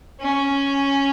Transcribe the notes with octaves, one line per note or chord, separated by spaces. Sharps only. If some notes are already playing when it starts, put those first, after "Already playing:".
C#4